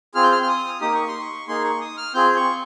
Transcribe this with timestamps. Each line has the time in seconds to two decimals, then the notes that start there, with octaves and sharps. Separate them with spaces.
0.15 C4 F4 G#4 F6
0.24 G6
0.32 F6
0.43 F6
0.48 D#6
0.81 A#3 D#4 G4 D#6
0.95 C#6
1.08 C6
1.20 C#6
1.48 A#3 D#4 G#4 C6
1.64 C#6
1.81 D#6
1.97 F6
2.14 C4 F4 G#4 G6
2.37 C#6